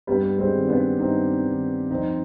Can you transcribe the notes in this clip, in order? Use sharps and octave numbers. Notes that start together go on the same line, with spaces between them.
G2 G3 B3
G#3 C4
D#3
B3 D4
G2 C4 D#4
D#3
F2 C4 D#4